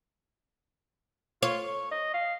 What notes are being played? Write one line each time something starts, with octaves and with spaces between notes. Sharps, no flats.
F4 C#5
C#6
D#5
F5